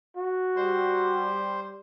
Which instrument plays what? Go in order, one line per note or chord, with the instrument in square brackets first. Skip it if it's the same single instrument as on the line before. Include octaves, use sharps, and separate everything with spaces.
[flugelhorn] F#4
[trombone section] G3 [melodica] C5 C6